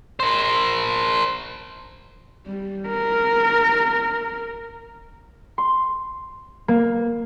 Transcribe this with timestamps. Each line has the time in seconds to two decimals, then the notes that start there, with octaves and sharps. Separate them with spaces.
0.20 A#4 C5
2.46 G3
2.88 A#4
5.58 C6
6.68 A#3